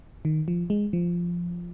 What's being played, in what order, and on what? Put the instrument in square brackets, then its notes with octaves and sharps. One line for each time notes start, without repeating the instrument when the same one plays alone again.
[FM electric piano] D#3
F3
G#3
F3